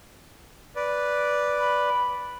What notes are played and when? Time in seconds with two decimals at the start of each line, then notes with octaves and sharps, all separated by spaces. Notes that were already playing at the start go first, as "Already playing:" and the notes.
0.76 B4 D5
1.57 B5